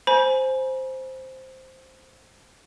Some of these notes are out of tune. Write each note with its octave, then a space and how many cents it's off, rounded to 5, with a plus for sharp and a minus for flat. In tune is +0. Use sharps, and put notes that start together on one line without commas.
C5 +0 G#5 +20 B5 -40